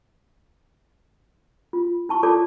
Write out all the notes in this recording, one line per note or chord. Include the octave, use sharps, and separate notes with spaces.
F4
E4 A5 C#6
F4 A4 C#5 D5 A5 D6